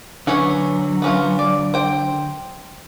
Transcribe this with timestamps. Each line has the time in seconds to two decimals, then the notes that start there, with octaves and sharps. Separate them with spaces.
0.27 D3 F#3 B3 C#4 C#5
1.02 B3 C#4 F4
1.39 D5
1.74 C5 G5